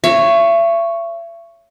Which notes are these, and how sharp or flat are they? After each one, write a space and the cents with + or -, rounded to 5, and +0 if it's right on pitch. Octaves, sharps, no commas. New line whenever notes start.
C#5 +0 E5 +40